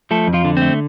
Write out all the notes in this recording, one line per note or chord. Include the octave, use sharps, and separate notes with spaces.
F3 A3 A4
F2
F3 F4
D3
A3 C4